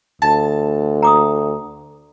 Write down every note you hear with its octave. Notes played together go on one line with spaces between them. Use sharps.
D2 A5
A#5 D6 D#6